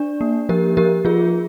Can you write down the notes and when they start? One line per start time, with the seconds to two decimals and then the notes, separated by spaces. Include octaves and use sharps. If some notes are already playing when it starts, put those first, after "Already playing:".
Already playing: D4 D5
0.21 A#3
0.49 F3 G4 A#4
0.77 F3 G4 A#4
1.05 F3 F4 G#4